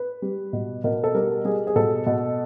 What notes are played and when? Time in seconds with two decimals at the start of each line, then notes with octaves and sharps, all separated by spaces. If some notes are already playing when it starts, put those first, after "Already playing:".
Already playing: B4
0.22 G3
0.53 B2
0.84 B2 A#4
1.04 A4
1.14 G3 A#4
1.45 G3 G#4
1.67 G#4
1.76 B2 A4
2.07 B2